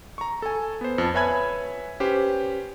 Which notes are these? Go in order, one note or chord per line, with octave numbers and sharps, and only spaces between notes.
A#5 C#6
A4 G#5
B3 C5
F2 A5
B4 C#5 E5 G#5 B5 G#6
C#4 G4 B4 C5